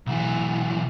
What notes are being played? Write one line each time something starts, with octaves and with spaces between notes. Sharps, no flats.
B1 E3